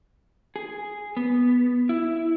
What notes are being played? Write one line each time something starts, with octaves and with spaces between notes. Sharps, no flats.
G#4
B3
E4